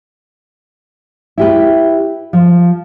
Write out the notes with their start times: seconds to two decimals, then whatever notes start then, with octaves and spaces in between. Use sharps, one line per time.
1.38 E4 G4 B4
2.33 F3